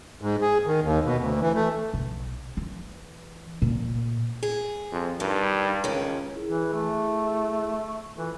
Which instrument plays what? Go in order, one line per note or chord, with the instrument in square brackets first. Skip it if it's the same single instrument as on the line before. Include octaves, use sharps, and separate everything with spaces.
[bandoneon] G#2
G#4
D#3
D#2
B2
D2
E3
A3
[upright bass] B1
E3
A#2
[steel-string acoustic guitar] G#4
[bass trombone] F2
[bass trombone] G2 [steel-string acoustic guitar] D#3
[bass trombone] C#2 [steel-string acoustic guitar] D#3 C#4
[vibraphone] E4 G#4
[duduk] E3
A3
[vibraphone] C#6
[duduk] E3 [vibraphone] F4 A4